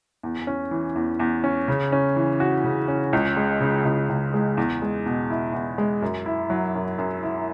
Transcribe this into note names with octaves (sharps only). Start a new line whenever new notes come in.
E2
C#4
E3
E2
E2
C#4
C#3
C#4
E3
F#4
C#3
C#4
C#2
G#3
C#3
C#2
C#2
G#3
E2
G#3
B2
E4
E2
G#3
F#2
E4
F#3
F#2
F#2
E4